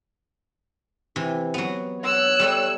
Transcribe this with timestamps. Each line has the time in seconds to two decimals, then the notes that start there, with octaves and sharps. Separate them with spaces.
1.16 C3 E3
1.54 F#3 B3
2.01 C#5 E6 F#6
2.40 G3 A3 A4